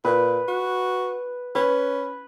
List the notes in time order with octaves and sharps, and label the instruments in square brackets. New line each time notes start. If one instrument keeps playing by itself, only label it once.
[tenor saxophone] A#2 [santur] B4
[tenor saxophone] F#4
[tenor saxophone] C#4 [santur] B4